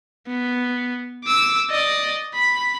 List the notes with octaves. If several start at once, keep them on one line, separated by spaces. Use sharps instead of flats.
B3
D6 E6
D5 D#5
B5